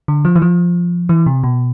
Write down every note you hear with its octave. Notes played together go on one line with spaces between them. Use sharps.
D3
F3
E3
F3
E3
C3
B2